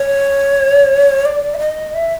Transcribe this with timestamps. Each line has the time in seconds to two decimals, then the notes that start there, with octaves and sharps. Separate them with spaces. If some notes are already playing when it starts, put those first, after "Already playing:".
Already playing: C#5
1.25 D5
1.54 E5
1.59 D#5
1.94 E5